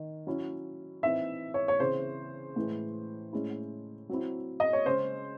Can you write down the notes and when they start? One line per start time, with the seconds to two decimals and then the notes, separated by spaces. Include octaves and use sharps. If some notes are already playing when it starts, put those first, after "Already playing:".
Already playing: D#3
0.27 F#3 C#4 E4
1.03 E3 C4 D#4 E5
1.54 C#5
1.68 C#5
1.80 C#3 E3 C4 C5
2.56 A2 E3 G#3
3.33 A2 G#3 C#4 E4
4.09 F#3 C4 E4
4.60 D#5
4.73 C#5
4.85 C#3 G#3 C#4 C5